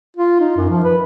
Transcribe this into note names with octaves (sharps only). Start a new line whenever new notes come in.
F4
D#4
F#2
F3
B4